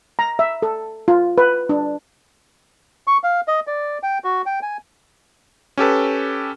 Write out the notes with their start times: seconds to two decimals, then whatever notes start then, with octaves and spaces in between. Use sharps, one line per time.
0.19 A#5
0.39 E5
0.62 A4
1.08 F4
1.38 B4
1.69 D4
3.07 C#6
3.24 F5
3.48 D#5
3.67 D5
4.03 G5
4.24 F#4
4.46 G5
4.62 G#5
5.77 C#4 G4 A4 B4